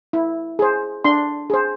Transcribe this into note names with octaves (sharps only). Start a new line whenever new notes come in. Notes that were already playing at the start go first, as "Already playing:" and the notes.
E4
G#4 C5
D4 C6
G#4 C5